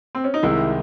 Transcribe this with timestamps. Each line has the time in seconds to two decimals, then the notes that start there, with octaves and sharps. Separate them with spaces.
0.15 C4
0.24 C#4
0.34 D#4
0.43 C2 C3 D#3 G#3 E4